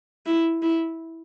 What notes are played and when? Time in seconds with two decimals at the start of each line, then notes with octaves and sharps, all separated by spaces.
0.26 E4
0.62 E4